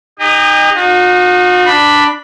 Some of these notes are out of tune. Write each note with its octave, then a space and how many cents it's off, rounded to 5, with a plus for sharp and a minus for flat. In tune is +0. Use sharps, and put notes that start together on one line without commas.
D#4 -10 G4 +40 D#5 -15
D#4 -25 F#4 -45
D4 +5 B5 +0